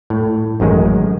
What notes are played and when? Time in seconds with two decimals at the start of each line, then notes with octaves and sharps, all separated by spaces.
0.10 A2
0.60 A1 F#2 D#3 G#3